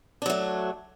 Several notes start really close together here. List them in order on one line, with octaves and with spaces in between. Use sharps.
D4 F#3 A3